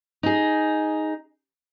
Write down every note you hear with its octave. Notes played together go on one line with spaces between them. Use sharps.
D#4 G#4